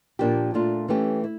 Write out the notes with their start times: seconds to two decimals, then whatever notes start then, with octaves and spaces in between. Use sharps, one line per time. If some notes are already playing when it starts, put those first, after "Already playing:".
0.19 A#2 F3 A#3 D4 G4
0.54 A#2 A3 D4 F4
0.89 E3 A3 C#4 G4
1.24 E4